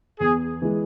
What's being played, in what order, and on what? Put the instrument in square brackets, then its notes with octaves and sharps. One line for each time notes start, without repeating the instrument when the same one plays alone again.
[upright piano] E2 [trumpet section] G#4
[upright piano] E3 G#3